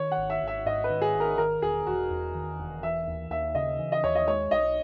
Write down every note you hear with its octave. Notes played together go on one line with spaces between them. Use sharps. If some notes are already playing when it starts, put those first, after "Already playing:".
Already playing: D#3 C#5
F#5
G#1
E5
G#1 E5
G#2 D#5
B4
D#3
G#4
G#1
A#4
D#3 A#4
E1 G#4
E1 F#4
E2
D#3
E1
E3 E5
D#2
D#2 E5
C#3 D#5
E3
D#5
D#2 C#5
D#5
G#3 C#5
B1 D#5